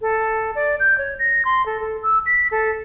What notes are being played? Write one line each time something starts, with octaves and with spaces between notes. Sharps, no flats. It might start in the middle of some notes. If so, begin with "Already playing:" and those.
A4
D5
G6
C#5
A#6
C6
A4
A4
E6
B6
A4